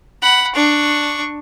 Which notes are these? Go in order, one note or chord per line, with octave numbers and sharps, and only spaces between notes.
F#5 B5
D4 C#6